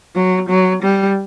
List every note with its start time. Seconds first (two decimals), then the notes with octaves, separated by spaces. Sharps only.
0.15 F#3
0.49 F#3
0.83 G3